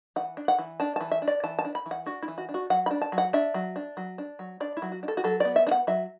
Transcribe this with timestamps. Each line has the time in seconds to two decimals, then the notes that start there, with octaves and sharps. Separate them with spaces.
0.16 E3 F#5
0.37 D4
0.48 F#5
0.59 E3
0.80 D4 A5
0.96 E3 A5
1.11 E5
1.22 D4
1.28 D5
1.44 E3 A5
1.59 A5
1.65 D4
1.75 B5
1.86 E3
1.91 F#5
2.06 D4 F#4
2.23 E4
2.28 E3
2.38 F#4
2.49 D4
2.54 F#4
2.70 F#3 F#5
2.86 B5
2.91 D4
3.02 A5
3.12 F#3
3.18 F#5
3.33 D4 E5
3.54 F#3
3.76 D4
3.97 F#3
4.18 D4
4.39 F#3
4.60 D4 D5
4.77 E4
4.82 F#3
4.92 F#4
5.03 D4
5.08 A4
5.17 F#4
5.24 F#3 A4
5.40 B3 D5
5.56 E5
5.67 D4
5.71 F#5
5.87 F#3 E5